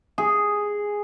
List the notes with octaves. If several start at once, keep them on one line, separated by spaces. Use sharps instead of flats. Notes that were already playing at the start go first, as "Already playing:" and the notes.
G#4